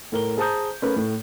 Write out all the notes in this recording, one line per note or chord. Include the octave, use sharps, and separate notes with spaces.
A2 A#4 G7
G#4 C5 A5 A#5 D#6 G6
A3 C#4 A#4 B4
A2